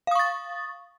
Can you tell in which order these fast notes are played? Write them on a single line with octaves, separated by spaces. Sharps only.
F5 D#6 C#6 A6